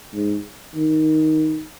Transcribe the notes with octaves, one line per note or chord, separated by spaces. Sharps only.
G#2
D#3